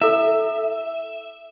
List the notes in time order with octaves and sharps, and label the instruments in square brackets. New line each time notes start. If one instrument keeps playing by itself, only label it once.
[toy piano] E4 A4 [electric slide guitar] E5